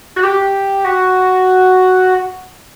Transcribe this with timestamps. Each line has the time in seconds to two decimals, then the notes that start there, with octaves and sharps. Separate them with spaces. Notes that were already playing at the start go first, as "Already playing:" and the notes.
0.16 F#4
0.23 G4
0.85 F#4